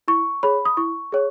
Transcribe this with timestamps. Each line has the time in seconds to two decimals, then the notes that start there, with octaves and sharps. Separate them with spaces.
0.08 E4 C#6
0.43 G#4 C#5 B5
0.65 D#6
0.77 E4 C#6
1.12 G#4 C#5